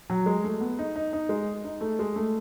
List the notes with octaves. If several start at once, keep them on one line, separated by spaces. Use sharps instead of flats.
F#3
G#3
A3
B3
D#4
D#4
D#4
G#3
D#4
A3
G#3
A3